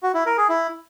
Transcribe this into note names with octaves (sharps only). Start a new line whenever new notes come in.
F#4
E4
A#4
G#4
E4